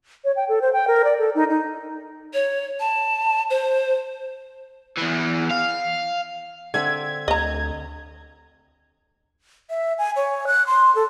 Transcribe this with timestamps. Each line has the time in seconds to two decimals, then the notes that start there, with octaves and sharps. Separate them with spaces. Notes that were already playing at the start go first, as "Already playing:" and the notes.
0.25 C#5
0.36 G5
0.49 A4
0.62 C5
0.73 G5
0.88 A#4
1.04 D5
1.19 A4
1.35 D#4
1.50 D#4
2.34 C#5
2.80 A5
3.50 C5
4.98 E2 E3
5.51 F5
6.74 D3 C4 E5 G#6
7.28 D2 D#5 A#5
9.70 E5
9.98 G#5
10.16 C#5
10.47 F#6
10.67 C6
10.95 A4